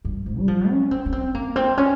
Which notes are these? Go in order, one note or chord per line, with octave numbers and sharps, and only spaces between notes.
G2
G#2
G3
F3
C#4
C4
C#4
C4
A#3
C4
C#4